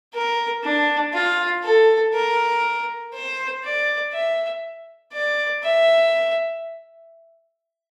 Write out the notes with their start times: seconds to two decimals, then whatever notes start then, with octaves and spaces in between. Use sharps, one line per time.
0.14 A#4
0.63 D4
1.13 F4
1.63 A4
2.13 A#4
3.13 C5
3.63 D5
4.12 E5
5.13 D5
5.63 E5